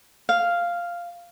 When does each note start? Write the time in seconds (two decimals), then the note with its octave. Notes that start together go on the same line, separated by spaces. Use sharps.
0.29 F5